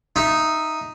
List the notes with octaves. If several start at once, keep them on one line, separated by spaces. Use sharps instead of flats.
D#4 E5